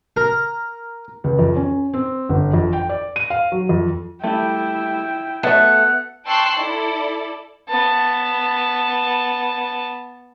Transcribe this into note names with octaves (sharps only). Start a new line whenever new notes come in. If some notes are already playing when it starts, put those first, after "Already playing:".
A#4
C#2
F2
C#4
C4
G1
F2
G5
D5
D#7
F5
F#3
F2
G3 A3 E4 G5
A3 B3 F#4 E5 F#5
G5 A5 C6 C#6 E6 F#6
E4 A4 D5
B3 A5